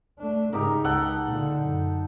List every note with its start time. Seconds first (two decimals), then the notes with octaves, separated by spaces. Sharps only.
0.18 A3 D4
0.53 G#2 C#3 D#4 G4 A#4
0.84 C#2 A4 F#5 G5
1.24 A#2 D3
1.61 F#2